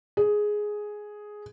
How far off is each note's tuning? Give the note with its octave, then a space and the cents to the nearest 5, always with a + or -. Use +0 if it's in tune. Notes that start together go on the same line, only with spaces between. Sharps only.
G#4 +5